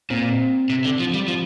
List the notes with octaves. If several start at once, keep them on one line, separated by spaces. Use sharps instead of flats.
A#2 C4
C3
D3
F3
G3
F3